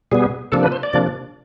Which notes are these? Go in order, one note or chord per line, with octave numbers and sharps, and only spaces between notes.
B2 G3 B3 G#4
C3 F3 A#3 D4 A4
B4
C5
D5
C3 F3 A#3 D4